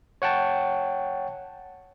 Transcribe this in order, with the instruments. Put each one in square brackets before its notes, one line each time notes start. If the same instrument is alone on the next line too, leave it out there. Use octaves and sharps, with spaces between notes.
[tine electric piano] C#5 F#5 G5 A5